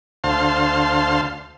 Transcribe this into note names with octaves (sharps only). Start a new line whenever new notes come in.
D2 C5 F5 A5 C6